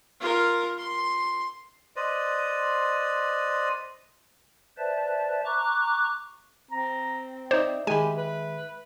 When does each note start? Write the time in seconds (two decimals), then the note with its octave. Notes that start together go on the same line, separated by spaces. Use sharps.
0.20 F4 A#4
0.78 C6
1.96 B4 C5 D5 D#5
4.78 B4 C5 D5 E5 A5
5.45 A#5 C#6 D6 F#6
6.71 C4 A#5
7.51 D#4 C5 D5 E5
7.87 D#3 G#3 G4 G#5 B5
8.17 B4